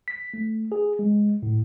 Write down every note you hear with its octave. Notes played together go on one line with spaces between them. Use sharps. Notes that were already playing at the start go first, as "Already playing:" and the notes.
B6
A3
G#4
G#3
A2